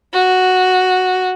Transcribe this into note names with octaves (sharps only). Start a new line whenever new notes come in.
F#4